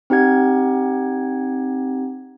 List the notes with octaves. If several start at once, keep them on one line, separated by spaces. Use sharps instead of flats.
C4 D#4 G4 F#5 G#6